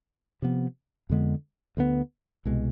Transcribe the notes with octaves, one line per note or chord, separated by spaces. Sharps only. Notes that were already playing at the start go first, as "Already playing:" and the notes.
C3 F3 B3
F2 D3 G#3 B3
D2 D3 G#3 B3
C2 B2 G#3